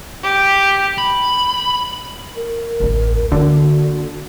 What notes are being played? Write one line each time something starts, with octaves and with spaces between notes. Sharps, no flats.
G4
B5
A#4
A1 D2
D3 A#3 F#4